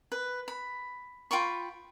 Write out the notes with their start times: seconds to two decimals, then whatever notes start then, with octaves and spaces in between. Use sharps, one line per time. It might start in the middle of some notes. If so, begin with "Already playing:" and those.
0.12 B4
0.48 B5
1.31 F4 G5 B5 C#6